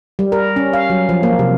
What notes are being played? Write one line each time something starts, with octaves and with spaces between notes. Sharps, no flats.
G3
A#4
C#4
F5
F#3
F3
A#3
C3